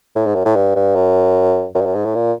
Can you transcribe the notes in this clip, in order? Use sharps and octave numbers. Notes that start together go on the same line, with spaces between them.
A2
G#2
F#2
A2
G2
G2
F#2
F#2
G2
F#2
G#2
A2
A#2